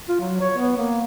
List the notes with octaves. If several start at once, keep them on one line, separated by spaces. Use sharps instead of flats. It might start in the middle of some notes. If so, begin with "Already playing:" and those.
F4
F#3
C#5
B3
A#3